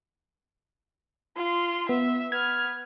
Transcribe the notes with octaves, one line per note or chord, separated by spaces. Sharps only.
F4 C6
B3 E5
B3 F6 G#6